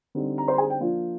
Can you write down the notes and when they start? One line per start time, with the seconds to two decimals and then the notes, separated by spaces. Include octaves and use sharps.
0.15 D3 G3 C4 D#4
0.38 A#5
0.48 C5 C6
0.53 A#5
0.58 G#4 G#5
0.70 G5
0.80 F3 A#3 D4 F4